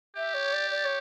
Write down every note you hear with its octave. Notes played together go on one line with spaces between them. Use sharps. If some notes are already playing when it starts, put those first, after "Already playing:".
G4 E5
C#5
D5
D5
C#5